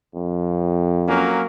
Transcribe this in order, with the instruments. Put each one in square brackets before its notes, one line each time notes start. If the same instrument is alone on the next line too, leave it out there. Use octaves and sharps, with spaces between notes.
[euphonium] F2
[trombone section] F#3 A#3 C#4